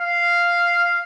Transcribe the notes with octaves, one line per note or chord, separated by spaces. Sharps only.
F5